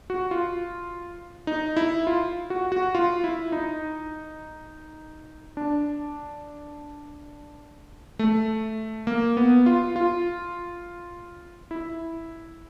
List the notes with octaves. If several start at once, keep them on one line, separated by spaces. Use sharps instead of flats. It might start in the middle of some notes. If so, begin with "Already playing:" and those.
F#4
F4
D#4
E4
F4
F#4
F#4
F4
E4
D#4
D4
A3
A#3
B3
F4
F4
E4